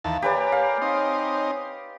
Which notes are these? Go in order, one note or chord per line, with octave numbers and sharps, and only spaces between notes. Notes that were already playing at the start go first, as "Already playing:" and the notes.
D#2 E3 F5 A5
A#3 G4 B4 C#5 D5 G#5
F5
C4 D#4